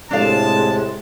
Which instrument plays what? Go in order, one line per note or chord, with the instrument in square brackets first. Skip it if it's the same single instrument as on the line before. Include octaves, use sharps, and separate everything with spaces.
[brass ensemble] A2 C3 [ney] G#3 [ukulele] D4 A4 F5 [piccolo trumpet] A5